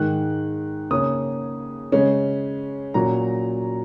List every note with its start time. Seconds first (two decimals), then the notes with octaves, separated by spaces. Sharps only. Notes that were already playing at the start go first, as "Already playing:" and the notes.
Already playing: G#2 D#3 G#3 F#6
0.91 C#3 A#3 C#4 D#6
1.92 C#3 G#3 C#4
2.94 A#2 F#3 C#4 A#5